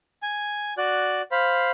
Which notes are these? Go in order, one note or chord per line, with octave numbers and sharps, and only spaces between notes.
G#5
F#4 D5 F#6
C5 F5 B5